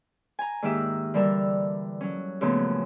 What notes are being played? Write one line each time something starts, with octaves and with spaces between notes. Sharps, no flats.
G#5 A#5
G#2 D#3 A#3 G4 E5 E6
D3 E3 G3 A4 A#4 E6
F#3 C#4
F#2 A#2 C#3 F3 A3 B3